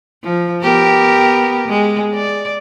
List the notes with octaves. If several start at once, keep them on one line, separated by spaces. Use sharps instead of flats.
F3
B3 G4 A#4
G#3
D5